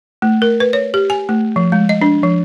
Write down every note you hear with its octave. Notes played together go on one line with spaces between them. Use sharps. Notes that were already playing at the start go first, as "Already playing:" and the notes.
A3
A#4
B4
C#5
G4
G#5
A3
F3
G#3
D#5
D4
F3